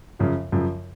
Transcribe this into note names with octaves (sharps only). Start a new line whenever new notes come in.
F#2 C#3 F3
F#2 C#3 F3